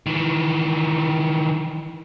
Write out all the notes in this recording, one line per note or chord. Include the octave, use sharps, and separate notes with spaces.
D#3 E3